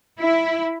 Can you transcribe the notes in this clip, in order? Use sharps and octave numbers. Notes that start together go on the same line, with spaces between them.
E4